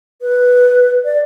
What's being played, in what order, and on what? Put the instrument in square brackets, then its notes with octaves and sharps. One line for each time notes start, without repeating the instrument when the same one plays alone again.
[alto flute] B4
D5